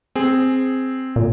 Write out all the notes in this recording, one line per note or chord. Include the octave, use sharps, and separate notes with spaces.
C4 G#4
A#2